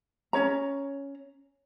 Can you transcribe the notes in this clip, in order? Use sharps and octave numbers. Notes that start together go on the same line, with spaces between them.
C#4 D#4 C#5 A#5